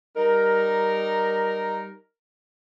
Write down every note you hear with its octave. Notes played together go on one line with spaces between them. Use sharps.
G3 D#4 A#4